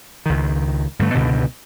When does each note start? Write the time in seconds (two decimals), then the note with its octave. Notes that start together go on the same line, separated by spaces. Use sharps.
0.26 C#2 D#3
0.99 G2 D3 A3
1.14 C#2 G2 B2 D3